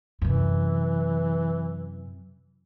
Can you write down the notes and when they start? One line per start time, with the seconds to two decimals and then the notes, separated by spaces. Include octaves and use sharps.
0.22 F#2 C3 E3